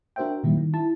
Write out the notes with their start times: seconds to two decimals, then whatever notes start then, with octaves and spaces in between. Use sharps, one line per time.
0.16 D4 F#4 A#4 C5 E5 G5
0.44 A#2 D#3 F#3 G3 E4
0.57 D#3
0.74 E4 A5